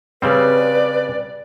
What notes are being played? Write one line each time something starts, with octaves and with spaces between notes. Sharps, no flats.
C#3 G3 C4 B4 D5